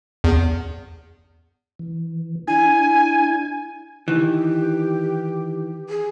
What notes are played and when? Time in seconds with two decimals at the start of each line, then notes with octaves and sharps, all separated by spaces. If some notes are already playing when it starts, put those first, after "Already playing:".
0.24 E2
1.79 E3
2.48 D4 E4 G#5 G#6
4.08 D#3 E3 G4
5.89 G#4